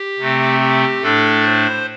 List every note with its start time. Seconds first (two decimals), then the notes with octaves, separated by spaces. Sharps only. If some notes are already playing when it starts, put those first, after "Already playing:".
Already playing: G4
0.19 C3 A3 C4
0.60 G4
1.01 A2 A3 D4 A4
1.43 C5